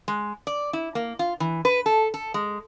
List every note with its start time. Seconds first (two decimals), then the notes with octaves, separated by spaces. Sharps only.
0.08 G#3
0.47 D5
0.73 E4
0.95 A#3
1.19 F4
1.40 E3
1.65 B4
1.86 A4
2.14 A4
2.34 G#3